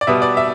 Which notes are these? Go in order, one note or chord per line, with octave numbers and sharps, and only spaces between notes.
D5
B2 G3 B3 E5
D5
E5